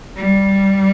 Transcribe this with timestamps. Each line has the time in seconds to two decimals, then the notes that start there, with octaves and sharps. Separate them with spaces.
0.17 G3